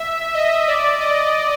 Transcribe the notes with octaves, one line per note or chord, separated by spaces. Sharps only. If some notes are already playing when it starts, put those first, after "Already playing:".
Already playing: E5
D#5
D5
D#5